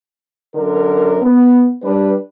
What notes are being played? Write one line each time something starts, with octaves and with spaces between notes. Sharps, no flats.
F#2 D3 A#4
B3
G3 D4 B4